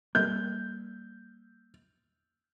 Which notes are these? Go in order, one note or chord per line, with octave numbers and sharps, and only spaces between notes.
G3 A3 A#3 G6